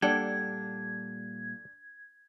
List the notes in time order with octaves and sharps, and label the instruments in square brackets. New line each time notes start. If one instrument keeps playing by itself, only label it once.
[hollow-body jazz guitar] A#2 G3 [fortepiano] D4 [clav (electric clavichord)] A4 F#5 G5 [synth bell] G#6